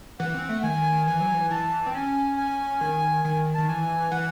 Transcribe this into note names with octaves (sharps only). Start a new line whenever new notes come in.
E3 F#5
C4
A3
D#3 G#5
E3 G#5
F#3
E3
E3 A5
C4
C#4 G#5
G#5
D#3 G#5
D#3 G#5
D#3 A5
E3 G#5
E3 F#5